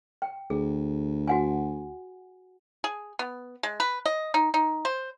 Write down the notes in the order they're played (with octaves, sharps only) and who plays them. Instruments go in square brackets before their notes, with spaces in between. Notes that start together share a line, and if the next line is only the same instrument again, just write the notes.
[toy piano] G5
[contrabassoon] D2 [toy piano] G#4
[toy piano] F#4 F#5 G#5
[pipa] G#4
B3
G#3
B4
D#5
D#4
D#4
C5